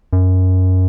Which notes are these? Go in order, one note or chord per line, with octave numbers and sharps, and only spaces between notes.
F#2